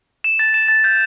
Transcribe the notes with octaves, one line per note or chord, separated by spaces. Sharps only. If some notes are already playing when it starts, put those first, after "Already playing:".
E7
A6
E7
A6
G6